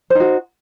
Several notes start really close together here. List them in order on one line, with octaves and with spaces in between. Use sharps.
C5 D#4 F#4